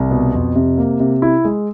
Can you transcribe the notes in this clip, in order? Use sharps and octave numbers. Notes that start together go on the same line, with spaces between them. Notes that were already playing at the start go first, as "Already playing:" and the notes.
Already playing: C2
B2
F2
C3
A#3
C3
E4
G#3